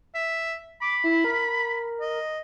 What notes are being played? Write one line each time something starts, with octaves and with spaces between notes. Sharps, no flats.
E5
B5 D6
E4
A#4
D#5